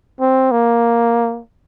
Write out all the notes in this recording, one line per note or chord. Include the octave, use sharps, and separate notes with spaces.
C4
A#3